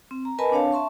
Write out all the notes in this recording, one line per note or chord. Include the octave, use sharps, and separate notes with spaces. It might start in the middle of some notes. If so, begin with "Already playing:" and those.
C4
A#5
A#4 B4 D#5 G#5 A5 B5
C4 D4 C#5 F5 A5
E5 A5 C6 C#6